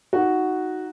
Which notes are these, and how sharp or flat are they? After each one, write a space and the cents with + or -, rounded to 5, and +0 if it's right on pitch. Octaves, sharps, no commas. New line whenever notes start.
D#4 +10 F#4 +0